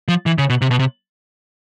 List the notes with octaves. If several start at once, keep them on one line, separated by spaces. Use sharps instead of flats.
F3
E3
C#3
B2
C3
B2
C3